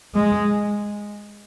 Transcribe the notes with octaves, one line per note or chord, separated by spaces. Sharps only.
G#3